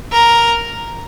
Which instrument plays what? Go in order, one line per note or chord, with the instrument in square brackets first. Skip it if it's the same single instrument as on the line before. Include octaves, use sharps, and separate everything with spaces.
[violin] A#4